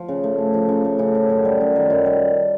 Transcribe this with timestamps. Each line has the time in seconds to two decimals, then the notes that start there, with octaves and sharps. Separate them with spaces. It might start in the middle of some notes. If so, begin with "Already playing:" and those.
Already playing: F3
0.08 C#3
0.24 A3
0.38 C#3
0.54 F3
0.69 C#3
0.85 A3
0.99 C#3
1.15 F3
1.30 F#2
1.45 G3
1.61 F#2
1.76 D#3
1.90 F#2
2.06 G3